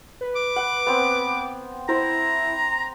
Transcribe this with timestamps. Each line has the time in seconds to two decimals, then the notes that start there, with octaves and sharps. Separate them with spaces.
0.21 B4
0.36 D6
0.56 F#5
0.86 B3 C4
1.89 E4 C5 A#5